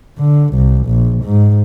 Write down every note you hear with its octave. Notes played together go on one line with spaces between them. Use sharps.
D3
C2
A#1
G#2